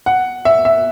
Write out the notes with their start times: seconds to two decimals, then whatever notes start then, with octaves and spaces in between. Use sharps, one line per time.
0.06 F#5
0.45 E5
0.65 E5